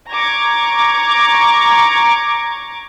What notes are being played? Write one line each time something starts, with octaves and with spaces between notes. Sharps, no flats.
A#5 C#6 D6 G#6